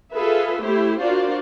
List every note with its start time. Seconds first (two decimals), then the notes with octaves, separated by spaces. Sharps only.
0.13 F4 G#4 A4 B4 E5
0.62 A3 E4 G4 C5
1.00 D4 F4 F#4 A#4 C5 D5